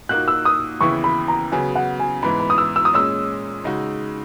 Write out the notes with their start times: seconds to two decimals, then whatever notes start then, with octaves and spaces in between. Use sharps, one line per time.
0.09 A#2 A#3 D#4 F#4 F#6
0.28 E6
0.45 D#6
0.81 D#2 C#3 E3 B3 E4 C#6
1.04 B5
1.28 A#5
1.52 C#3 F#3 B3 G#5
1.75 F#5
2.00 G#5
2.23 G#2 E3 B3 B5
2.40 B5
2.50 D#6
2.58 E6
2.76 E6
2.85 D#6
2.93 A#2 G#3 C#4 E6
3.64 C#3 G#3 D#4 F#4